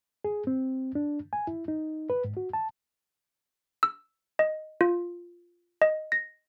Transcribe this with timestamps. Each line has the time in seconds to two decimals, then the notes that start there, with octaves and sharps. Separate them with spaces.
0.25 G#4
0.47 C4
0.95 D4
1.33 G#5
1.47 E4
1.68 D#4
2.10 B4
2.25 G#2
2.37 F#4
2.53 A5
3.83 E6
4.39 D#5
4.81 F4
5.82 D#5
6.12 A#6